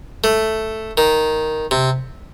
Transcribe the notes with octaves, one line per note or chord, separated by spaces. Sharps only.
A3
D#3
C3